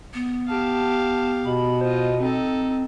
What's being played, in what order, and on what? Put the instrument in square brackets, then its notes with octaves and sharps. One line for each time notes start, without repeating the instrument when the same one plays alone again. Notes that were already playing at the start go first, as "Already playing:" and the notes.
[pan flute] B3
[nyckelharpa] G4 F5 [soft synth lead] A5
[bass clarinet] B2 [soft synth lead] B5
[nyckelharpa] F4 D#5 [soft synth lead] C5
[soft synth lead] C4 [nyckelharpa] D#4 A4